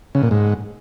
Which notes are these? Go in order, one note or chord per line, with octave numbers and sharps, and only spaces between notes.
C#3
A#2
G#2